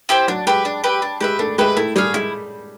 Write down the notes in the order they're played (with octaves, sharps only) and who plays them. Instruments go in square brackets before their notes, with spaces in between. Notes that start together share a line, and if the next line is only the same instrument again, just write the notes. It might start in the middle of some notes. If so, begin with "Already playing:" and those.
[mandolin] E4 G4 C5
[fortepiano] F#3 [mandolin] D4
[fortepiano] G#3 [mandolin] G4 B4 E5
[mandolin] D4
G4 B4 E5
D4
[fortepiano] G#3 [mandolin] G4 B4 E5
[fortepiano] A3 [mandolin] D4
[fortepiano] G#3 [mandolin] G4 B4 E5
[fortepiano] A3 [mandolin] E4
[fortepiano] G3 [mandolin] G#4 C#5 F5
[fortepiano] G#3 [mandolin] E4